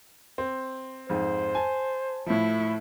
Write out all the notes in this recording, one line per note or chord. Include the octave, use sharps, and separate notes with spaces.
C4
F2 G#2 C5
G#5 A5
A2 F3 A3 E4